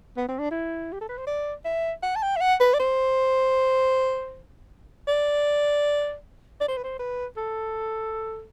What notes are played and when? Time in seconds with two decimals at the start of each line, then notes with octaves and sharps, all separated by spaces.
0.17 B3
0.28 C4
0.39 D4
0.51 E4
0.92 G4
1.01 A4
1.09 B4
1.17 C5
1.27 D5
1.65 E5
2.02 F#5
2.15 A5
2.22 G5
2.36 E5
2.41 F#5
2.60 B4
2.74 D5
2.79 C5
5.08 D5
6.61 D5
6.68 C5
6.77 B4
6.83 C5
6.99 B4
7.37 A4